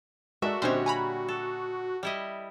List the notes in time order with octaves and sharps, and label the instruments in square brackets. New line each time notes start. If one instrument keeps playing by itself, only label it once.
[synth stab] G#3 [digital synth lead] F#4 [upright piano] A4 A#4 D5 [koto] E5
[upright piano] A#2 D3 D#5 [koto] G3 C#5 [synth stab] C4 C#4 C5
[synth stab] G#5 A#5 B5
[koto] A4
G3 E4 D#5